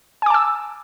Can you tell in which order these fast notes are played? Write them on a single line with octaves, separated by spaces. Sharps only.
G#5 D6 A5 E6